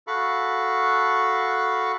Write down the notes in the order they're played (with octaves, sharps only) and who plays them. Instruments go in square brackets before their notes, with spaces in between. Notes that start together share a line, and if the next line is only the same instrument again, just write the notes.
[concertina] F#4 A4 F5 B5 C#6